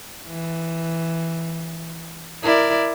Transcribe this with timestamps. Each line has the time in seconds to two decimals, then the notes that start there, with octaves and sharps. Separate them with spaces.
0.27 E3
2.43 E4 A#4 D5